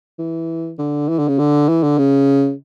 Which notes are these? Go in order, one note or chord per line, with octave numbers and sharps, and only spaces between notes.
E3
D3
E3
D3
C#3
D3
E3
D3
C#3